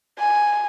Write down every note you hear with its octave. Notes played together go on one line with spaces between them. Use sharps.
G#5